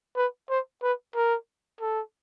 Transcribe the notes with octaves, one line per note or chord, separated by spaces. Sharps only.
B4
C5
B4
A#4
A4